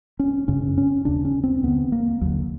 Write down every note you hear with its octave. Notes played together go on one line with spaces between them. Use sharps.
C#4
F#2 C#3 C#4
C#4
D#2 C#3 D4
C#4
C4
D#2 D3 B3
A#3
D#2 D3 F#3